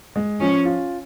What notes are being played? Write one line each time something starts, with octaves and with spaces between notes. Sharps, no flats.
G#3
F3 C#4
F4